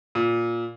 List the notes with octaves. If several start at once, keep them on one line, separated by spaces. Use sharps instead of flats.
A#2